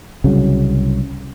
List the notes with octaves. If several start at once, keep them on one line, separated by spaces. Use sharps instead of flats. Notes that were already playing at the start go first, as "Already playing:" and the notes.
C2 C#3 F#3